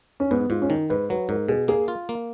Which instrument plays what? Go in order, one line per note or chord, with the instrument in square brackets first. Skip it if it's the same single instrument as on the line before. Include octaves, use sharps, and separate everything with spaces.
[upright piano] C#4
[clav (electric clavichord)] G#2 [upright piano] B3
[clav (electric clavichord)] G#2 [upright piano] F4
[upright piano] C#4
[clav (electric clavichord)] D#3 [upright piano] D#4
[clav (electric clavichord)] G#2 [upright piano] B4
[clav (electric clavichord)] F#3 [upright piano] B4
[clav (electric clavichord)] G#2 [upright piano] A#4
[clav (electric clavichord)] B2 [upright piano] G#4
[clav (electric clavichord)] A#3 [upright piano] G#4
[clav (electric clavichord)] F4
A#3